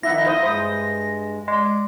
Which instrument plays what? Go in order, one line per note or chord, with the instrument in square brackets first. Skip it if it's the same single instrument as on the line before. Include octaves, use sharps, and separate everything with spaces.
[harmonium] D#3 F3 D#4 [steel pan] E4 E5 F#5 [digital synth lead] A#6
[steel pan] E4 C5 D#5
[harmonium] G2 G#3 [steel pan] C5 D#6
[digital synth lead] G#3 [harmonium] D5